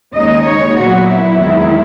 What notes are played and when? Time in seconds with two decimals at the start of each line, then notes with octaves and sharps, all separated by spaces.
0.15 D#2 C#3 G#3 D#4 D#5
0.46 C#5
0.76 A#2 F#3 B3 F#4
1.07 E4
1.38 E2 D#3 G#3